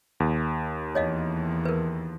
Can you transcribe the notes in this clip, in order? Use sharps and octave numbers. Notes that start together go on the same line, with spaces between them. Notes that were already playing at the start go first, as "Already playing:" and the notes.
D#2
E2 C#5 D#5 F5
A#4 B4